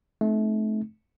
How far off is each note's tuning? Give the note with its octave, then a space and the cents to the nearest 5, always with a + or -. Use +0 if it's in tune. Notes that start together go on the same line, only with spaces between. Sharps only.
A3 -30 C4 +0 D#4 -5